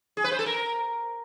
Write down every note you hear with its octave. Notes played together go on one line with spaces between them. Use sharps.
G#4
B4
C5
A4
A#4